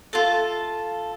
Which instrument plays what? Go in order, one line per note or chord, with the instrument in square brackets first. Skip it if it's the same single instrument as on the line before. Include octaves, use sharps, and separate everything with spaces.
[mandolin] F4 A4